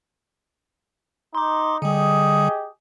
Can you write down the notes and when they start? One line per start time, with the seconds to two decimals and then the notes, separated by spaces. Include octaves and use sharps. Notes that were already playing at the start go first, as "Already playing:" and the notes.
1.35 D#4 C6 D6
1.82 D3 G3 G4 G#4 D#5